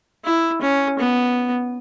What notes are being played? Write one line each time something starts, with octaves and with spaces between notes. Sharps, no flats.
E4
C#4
B3